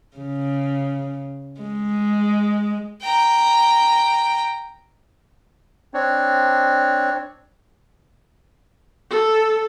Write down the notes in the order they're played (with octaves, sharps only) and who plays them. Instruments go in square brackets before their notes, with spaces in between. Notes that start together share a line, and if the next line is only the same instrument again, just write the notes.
[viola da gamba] C#3
G#3
[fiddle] G5 A#5
[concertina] C4 D4 C#5
[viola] A4